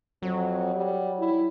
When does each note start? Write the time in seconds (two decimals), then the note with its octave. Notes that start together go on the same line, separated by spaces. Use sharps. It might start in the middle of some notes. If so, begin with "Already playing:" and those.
0.23 F2 F#3
0.75 G3
1.19 E4